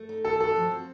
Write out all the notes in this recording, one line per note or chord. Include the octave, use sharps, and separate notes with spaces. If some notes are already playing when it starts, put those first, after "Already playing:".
Already playing: A3
D#4
D#3 A4
F#4 A4
F3
C4